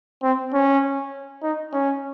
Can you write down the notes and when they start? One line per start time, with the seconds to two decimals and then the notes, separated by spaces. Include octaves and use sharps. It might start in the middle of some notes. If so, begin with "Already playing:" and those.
0.23 C4
0.53 C#4
1.43 D#4
1.73 C#4